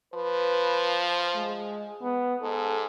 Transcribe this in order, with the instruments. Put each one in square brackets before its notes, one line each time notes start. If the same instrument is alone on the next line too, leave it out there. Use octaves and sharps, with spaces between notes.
[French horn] F3 [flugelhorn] B4
[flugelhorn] G#3
B3
[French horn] G#2 [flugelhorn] A4